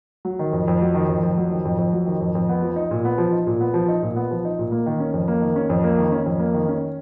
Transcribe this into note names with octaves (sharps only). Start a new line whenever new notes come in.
F#3
D#3
F2
F2
F#3
D#3
F2
F2
F#3
D#3
F2
F2
F#3
D#3
F2
F2
B3
F3
D#4
A#2
B3
F3
D#4
A#2
B3
F3
D#4
A#2
B3
F3
D#4
A#2
A#3
D#3
C#4
F2
A#3
D#3
C#4
F2
A#3
D#3
C#4
F2
A#3
D#3
C#4